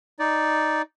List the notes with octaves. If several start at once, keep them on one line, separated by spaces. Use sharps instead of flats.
D#4 D5